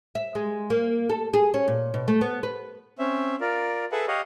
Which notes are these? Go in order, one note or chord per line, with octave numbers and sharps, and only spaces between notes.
E5
G#3
A#3
A4
G#4
C#4
A#2
B2
A3
B3
B4
C4 C#4 E5
F4 A#4 D5
G#4 A4 B4 E5 F#5
G4 C#5 D#5 F5 F#5